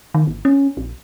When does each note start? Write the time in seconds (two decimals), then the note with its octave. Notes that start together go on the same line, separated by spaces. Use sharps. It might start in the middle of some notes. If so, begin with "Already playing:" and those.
0.14 D#3
0.27 G#1
0.45 C#4
0.77 A#1